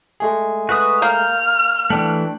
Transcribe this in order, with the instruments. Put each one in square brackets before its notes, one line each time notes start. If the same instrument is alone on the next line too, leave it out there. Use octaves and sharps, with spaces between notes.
[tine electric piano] G#3 A3 G#4
[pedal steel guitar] F#4 B4 D#6
[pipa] A#3 [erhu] F6 [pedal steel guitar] G6
[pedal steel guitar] E3 A3 [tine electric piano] D4 G5 F#6